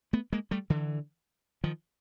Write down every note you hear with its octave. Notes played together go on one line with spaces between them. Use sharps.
A3 B3
G#3 A#3
G3 A3
D3 E3
D#3 F3